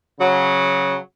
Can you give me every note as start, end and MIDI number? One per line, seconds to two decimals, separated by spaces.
0.20 0.95 49
0.20 0.95 54